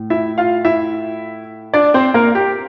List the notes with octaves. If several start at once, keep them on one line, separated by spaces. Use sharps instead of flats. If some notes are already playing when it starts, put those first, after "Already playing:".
Already playing: A2
E4 E5
F4 F5
E4 E5
D4 D5
C4 C5
A#3 A#4
G4